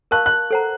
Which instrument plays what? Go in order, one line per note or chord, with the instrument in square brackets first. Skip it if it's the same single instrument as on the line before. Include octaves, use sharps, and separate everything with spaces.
[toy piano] A#4 F5 A5 C#6 [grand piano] F#6
[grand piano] F#6
[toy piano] A4 C5 F#5 A#5